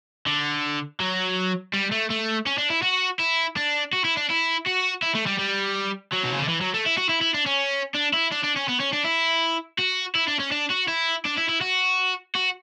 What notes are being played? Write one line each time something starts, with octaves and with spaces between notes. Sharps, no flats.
D3
F#3
G3
A3
A3
C#4
D4
E4
F#4
E4
D4
F#4
E4
D4
E4
F#4
E4
A3
G3
G3
F#3
B2
C#3
D3
E3
F#3
A3
E4
F#4
E4
E4
D4
C#4
D4
E4
D4
D4
C#4
B3
C#4
D4
E4
F#4
E4
D4
C#4
D4
F#4
E4
D4
E4
E4
F#4
F#4